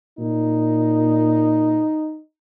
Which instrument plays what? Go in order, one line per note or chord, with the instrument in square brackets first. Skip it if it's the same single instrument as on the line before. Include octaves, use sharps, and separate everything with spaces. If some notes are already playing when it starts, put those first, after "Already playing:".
[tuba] A#2 [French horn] D#4